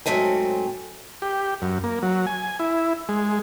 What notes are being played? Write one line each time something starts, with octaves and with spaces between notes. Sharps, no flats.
G#2 F#3 A3 C4 G#5
G4
F#2
A#3
F#3
G#5
E4
G#3